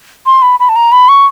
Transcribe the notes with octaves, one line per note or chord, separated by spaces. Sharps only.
C6
B5
B5
A5
A#5
B5
C#6